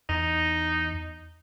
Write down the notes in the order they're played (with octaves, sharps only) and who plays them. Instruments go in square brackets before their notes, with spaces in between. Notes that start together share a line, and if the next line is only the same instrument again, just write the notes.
[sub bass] E2 [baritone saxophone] D#4